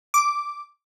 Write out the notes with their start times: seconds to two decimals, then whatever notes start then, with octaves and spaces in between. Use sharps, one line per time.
0.14 D6